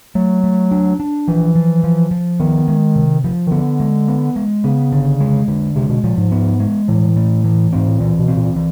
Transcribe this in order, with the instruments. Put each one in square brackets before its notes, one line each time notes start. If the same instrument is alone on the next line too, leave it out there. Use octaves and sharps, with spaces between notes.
[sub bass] F#3 [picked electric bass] A3
[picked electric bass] A3
D4
D4
[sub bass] E3 [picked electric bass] F3
[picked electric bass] F3
F3
F3
[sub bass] D#3 [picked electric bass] B3
[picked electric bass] G#3
C3
F3
[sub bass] D#3
[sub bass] D3 [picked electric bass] B3
[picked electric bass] G#3
B3
G#3
[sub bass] C#3 [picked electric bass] B3
[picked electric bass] D3
G#3
D3
[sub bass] C3 [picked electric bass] G#3
[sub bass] B2
[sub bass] A#2 [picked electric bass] F3
[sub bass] G#2
[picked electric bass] B3
G#3
[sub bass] A2 [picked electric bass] E3
[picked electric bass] A3
E3
[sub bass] G#2 [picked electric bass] C4
[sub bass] A2
[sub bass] A#2 [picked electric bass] E3
[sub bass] B2
[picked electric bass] C4
[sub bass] A#2
[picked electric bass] E3